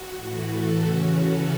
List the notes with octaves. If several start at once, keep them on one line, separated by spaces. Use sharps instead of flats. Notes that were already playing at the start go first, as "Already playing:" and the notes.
Already playing: F#4
A2 E3 A3
A4
C#3 E3 C#4 F#4
A4